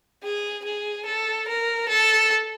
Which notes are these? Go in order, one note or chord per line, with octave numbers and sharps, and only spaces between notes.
G#4
G#4
A4
A#4
A4